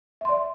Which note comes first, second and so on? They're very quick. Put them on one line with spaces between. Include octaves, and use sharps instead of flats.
E5 C6 D5